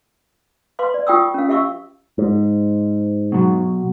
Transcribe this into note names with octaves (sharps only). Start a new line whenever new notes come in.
B4 F5 C6 D6
D5
F4 G5 C#6 D#6 E6
C#4 F5
G4 E5 F5 C#6 D6 E6
G#2
B2 F#3